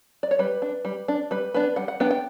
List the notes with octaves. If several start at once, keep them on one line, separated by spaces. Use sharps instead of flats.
D5
C#5
G3 B4
D4
G3
D4
G3 B4
B3 D4 B4
G3 F#5
F#5
B3 D4 G5
G5